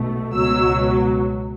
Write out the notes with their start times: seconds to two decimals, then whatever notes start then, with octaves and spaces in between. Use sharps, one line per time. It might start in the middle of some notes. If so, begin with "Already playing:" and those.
Already playing: B1 B2 A3
0.34 C#2 B2 F#3 E6